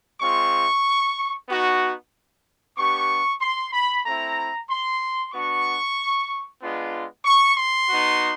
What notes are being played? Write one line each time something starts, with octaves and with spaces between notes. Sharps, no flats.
G#3 C4 F4 C#6
B3 D#4 F#4
B3 D4 G4 C#6
C6
B5
A3 C4 E4 A#5
C6
B3 D4 F#4 C#6
G#3 B3 D4 F4
C#6
C6
B3 D#4 F#4